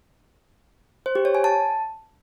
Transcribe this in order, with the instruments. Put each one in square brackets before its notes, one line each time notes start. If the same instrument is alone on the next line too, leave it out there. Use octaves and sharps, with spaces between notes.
[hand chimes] C5
G4
C#5
G#5
A5